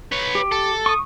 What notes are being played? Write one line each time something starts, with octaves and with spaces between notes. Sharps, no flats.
B4 C#5
G4
A4
C#6 D#6